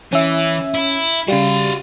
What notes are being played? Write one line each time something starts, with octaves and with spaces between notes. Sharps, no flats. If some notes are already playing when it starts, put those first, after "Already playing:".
E3 C#4 E5
E4
C#3 G3 F#4 F5